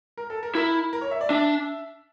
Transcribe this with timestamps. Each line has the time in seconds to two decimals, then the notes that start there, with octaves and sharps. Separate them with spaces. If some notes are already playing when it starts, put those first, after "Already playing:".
0.17 A#4
0.30 A4
0.43 A#4
0.55 E4 A#4
0.93 A#4
1.01 C#5
1.11 E5
1.21 D5
1.30 D4 E5